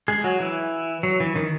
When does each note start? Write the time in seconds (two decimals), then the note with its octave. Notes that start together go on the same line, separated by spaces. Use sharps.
0.08 G#3 G#4
0.24 F#3 F#4
0.40 E3 E4
1.03 F#3
1.20 E3
1.36 D#3